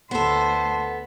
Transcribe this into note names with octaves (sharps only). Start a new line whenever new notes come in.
D2 B3 A4 C5